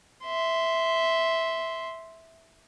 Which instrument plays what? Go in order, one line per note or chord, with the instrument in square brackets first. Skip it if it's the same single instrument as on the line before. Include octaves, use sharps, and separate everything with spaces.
[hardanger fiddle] E5 C6